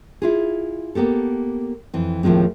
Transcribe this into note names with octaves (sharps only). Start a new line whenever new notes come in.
E4 F4 G#4
A#3 B3 G4 A4
F2 E3 C4
D#2 A2 F3 G#3 C4